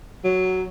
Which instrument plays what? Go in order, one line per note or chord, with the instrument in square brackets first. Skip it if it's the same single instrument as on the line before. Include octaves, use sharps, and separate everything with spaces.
[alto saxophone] F#3